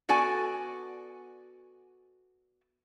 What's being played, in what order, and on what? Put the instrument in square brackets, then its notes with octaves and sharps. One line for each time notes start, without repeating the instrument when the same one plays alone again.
[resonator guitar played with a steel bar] B3 F#4 A4 D5 G#5